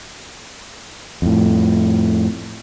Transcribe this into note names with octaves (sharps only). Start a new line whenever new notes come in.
F2 A2